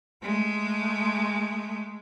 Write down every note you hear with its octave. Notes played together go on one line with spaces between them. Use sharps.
G#3 A3